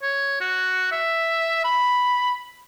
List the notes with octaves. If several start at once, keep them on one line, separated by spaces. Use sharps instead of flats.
C#5
F#4
E5
B5